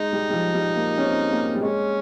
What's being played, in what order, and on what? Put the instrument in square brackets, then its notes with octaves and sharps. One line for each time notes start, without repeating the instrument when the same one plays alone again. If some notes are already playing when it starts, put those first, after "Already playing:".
Already playing: [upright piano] G#3 [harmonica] D#4
[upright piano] G3
G3
F3
G3
A#3
C#4
C4
A#3
G3
[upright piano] G#3 [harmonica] C#4